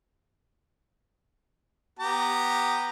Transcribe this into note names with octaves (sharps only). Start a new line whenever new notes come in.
B3 G4 A#5